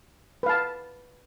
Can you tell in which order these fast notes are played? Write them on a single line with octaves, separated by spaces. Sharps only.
B4 F5 A5